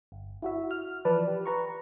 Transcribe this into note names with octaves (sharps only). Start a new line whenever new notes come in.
G1
E4 F#4 E5
F6
E3 F3 B4 D5 A5
G4
B4 A#5 C#6